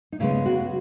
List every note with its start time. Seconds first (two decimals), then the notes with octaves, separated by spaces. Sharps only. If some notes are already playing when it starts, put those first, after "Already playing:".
0.12 D#4
0.20 C#3 G#3 B3 E4
0.46 F#4